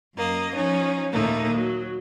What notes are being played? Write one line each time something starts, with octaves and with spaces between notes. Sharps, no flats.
F#2 A#3 D#5
F3 C#4 D#4
D#2 A#2 A3 A#3 D#4
F#3